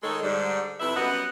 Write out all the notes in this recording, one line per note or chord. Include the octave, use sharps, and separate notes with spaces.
D#3 G#3 D#4 G#4 A4 C#5
G#2 D3 G3
F2 C3 E4 B4 E5
F#2 G3 B3 D#5 F#5